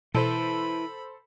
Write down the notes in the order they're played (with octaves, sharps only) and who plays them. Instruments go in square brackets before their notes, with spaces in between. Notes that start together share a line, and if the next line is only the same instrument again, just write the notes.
[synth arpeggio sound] B2 [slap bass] E3 [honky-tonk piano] A4 C5 [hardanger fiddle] B5